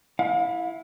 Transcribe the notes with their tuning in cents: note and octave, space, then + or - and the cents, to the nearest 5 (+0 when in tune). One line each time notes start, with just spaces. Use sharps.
E4 +0 F5 +35